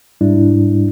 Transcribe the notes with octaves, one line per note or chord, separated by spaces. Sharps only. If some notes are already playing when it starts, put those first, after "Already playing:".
G#2 G3 D4 E4